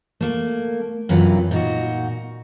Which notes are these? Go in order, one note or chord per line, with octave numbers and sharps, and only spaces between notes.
A3 A#3
F#2 C3 E3 F#3 F4
A#2 D#4 F#4